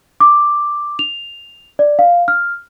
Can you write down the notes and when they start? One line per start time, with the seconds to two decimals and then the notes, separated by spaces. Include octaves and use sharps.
0.20 D6
0.99 F7
1.79 D5
1.99 F5
2.28 F6